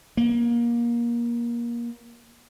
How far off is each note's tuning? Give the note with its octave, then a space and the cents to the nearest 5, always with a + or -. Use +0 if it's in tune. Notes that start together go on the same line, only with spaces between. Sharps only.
A#3 +25